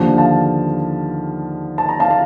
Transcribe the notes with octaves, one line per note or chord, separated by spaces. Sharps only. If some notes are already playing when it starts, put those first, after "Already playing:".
Already playing: D#2 D3 F3
F5 A5
A5
A#5
F5 A5
F5 A5